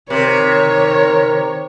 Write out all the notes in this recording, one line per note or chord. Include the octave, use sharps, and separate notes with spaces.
C3 D#3 A#4 C#5